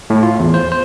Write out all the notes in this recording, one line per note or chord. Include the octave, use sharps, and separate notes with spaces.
A2
F4
E2
C5
C5